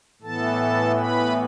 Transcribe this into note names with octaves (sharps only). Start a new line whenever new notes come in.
A2 E3 B3 A4 A5
B4 B5